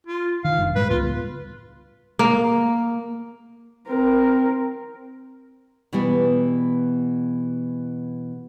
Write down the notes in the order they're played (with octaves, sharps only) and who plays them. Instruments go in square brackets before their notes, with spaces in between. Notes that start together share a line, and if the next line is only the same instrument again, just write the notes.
[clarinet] F4
[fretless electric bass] D#3 [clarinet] F5
[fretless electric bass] F1 G2
[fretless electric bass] A2 G3 G#3 [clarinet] B4
[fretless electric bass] C#2 B3 [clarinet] F4
[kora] A#3
[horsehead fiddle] C4 A#4
[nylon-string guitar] B2 E3 G3 B3